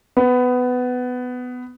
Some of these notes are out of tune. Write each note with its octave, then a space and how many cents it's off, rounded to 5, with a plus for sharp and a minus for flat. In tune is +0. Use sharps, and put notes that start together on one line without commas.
B3 +15